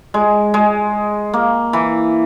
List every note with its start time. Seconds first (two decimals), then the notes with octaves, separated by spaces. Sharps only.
0.14 G#3
0.54 G#3
1.33 A#3
1.73 E3